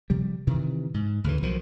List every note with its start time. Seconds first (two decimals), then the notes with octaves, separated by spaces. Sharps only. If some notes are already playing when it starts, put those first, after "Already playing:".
0.10 C3 F3 G3
0.47 C3 D#3 E3
0.94 G#2
1.24 D2 C#3 E3
1.43 B1 B2 D#3 F3